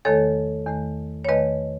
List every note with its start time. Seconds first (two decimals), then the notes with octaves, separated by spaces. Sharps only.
0.05 E2 D#3 A3 A4 C#5
0.66 E2 D#3 A3
1.25 C#5
1.29 E2 D#3 A3 B4 D#5